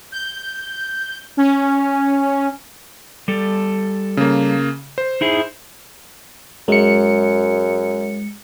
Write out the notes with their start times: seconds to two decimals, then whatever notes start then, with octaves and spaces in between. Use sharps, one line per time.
0.12 G6
1.37 C#4
3.28 G3 A4
4.17 C#3 A#3
4.98 C5
5.21 D#4 E4 G#4
6.68 F#2 G#3 C#7